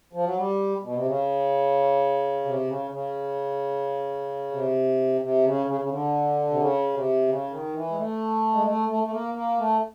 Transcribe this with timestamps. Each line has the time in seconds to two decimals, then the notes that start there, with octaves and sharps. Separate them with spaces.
0.13 F3
0.25 F#3
0.37 G3
0.83 B2
0.95 C3
1.06 C#3
2.45 C3
2.67 C#3
2.91 C#3
4.51 C3
5.21 C3
5.44 C#3
5.66 C#3
5.81 C#3
5.90 D3
6.50 C3
6.59 C#3
6.94 C3
7.28 C#3
7.50 D#3
7.74 E3
7.90 G#3
7.97 A3
8.54 G#3
8.66 A3
8.89 A3
9.03 A3
9.12 A#3
9.34 A#3
9.58 A3